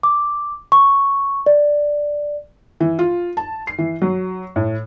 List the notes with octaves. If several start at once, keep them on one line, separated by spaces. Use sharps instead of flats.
D6
C#6
D5
E3
F4
A5
C7
E3
F#3
A2